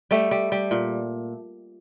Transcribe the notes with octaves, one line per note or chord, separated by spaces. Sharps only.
G3 A3
G3
G3
A#2